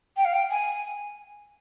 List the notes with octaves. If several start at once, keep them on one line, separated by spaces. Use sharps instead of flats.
G5
F5
G5
G#5